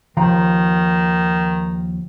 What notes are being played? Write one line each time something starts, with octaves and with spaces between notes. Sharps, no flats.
D#2 D#3 F3 A#5